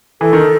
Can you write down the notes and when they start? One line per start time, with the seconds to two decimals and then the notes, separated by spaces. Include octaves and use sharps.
0.21 E3 A4
0.33 D#3